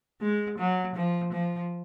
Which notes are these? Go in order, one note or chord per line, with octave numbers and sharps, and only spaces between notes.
G#3
F#3
F3
F3